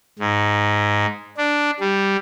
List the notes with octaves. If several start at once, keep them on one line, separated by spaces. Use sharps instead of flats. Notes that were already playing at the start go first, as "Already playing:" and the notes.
G#2
D4
G3